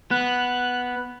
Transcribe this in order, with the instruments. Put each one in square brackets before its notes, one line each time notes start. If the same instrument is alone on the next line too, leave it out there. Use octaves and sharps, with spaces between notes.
[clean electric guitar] B3 [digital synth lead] F#6